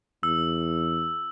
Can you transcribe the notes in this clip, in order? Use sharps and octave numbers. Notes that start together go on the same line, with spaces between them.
E2 E6